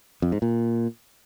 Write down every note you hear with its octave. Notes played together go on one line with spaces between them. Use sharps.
F2
G#2
A#2